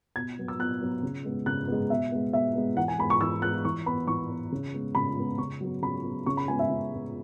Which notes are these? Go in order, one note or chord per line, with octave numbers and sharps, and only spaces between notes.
B2 G#6
F#3 B3
E6
B2 F#6
F#3 B3
C#3
G#3 B3
C#3 F#6
G#3 B3
B2 E5
G#3 B3
B2 E5
G#3 B3
E3 F#5
G#5
G#3 B3 B5
C#6
E3 E6
G#3 B3 F#6
E3 C#6
B3 B5
E3 C#6
B3
C#3
G#3 B3
C#3 B5
G#3 B3
C#3 C#6
F#3 B3
C#3 B5
F#3 B3
C#3 C#6
B5
G#3 B3 G#5
E5
C#3
G#3 B3